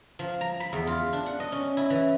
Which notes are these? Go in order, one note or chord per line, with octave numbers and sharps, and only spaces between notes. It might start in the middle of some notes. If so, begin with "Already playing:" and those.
F3
A#5
B5
E2
F4
D4
F#5
D#5
C#4
E4
E3